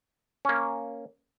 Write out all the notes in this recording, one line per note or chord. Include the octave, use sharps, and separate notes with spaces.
A#3 C#4